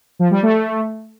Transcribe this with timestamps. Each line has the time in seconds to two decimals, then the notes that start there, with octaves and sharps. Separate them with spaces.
0.19 F3
0.31 G3
0.43 A3